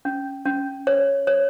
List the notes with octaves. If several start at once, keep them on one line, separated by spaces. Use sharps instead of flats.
C#4
C#4
C#5
C#5